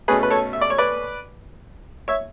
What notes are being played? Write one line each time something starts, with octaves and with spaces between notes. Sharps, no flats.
B2 A3 C#4 G#4 B4
B4
A4 C#5
E5
D5
C#5
B4 D5
C#5 E5